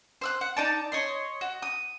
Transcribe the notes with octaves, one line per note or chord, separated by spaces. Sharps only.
C5 E6 F#6
F#5
D#4 D5 A5
C#5 D#5 C6
F#4
D#6